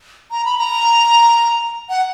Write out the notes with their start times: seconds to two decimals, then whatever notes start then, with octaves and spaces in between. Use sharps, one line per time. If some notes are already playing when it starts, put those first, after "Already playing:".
0.31 A#5
0.45 B5
0.58 A#5
1.89 F#5